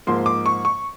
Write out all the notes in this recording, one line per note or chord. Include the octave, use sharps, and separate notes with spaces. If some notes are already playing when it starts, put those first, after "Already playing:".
G#2 F3 A#3 C6
D6
C#6
C#6